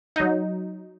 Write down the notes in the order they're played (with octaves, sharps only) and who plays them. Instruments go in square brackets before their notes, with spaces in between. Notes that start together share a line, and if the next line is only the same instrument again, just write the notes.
[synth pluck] F#3 D#4